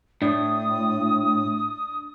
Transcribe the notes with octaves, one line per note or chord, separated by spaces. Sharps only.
A2 D4 D#6